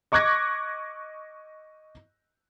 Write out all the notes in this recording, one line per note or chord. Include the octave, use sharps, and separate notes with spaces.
D#5 C#6 D6 F#6 G#6 A#6